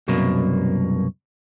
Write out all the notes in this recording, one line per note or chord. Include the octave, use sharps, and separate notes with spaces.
C2 F#2 B2 A#3